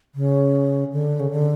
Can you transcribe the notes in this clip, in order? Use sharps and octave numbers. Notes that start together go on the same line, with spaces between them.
C#3
D3
C#3
D3